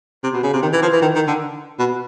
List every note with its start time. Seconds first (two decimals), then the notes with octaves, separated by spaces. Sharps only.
0.24 C3
0.34 B2
0.43 C#3
0.53 C3
0.63 D#3
0.73 E3
0.82 F3
0.93 E3
1.02 D#3
1.15 D#3
1.28 D3
1.79 B2